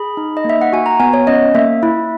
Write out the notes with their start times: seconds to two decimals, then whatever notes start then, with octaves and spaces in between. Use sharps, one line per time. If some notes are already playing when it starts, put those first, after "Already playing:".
Already playing: G#4 B5
0.17 D#4
0.37 D#5
0.44 A#3
0.50 E5
0.61 F#5
0.72 F#4 G#5
0.86 A#5
1.00 B3 G#5
1.13 C#5
1.27 C#4 D#5
1.54 A#3 E5
1.83 E4